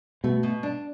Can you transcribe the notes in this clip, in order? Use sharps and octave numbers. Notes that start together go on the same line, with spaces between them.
B2 A3
B2
D4